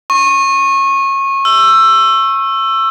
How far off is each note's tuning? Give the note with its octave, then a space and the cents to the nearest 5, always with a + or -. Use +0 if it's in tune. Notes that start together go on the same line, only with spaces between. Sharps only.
C#6 -25
E6 +15